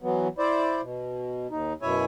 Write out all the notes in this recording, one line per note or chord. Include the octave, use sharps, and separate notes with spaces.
E3 F#3 B3
E4 C5 D5
B2
D#2 D#4
F#2 B2 E4 C#5 E5 G#5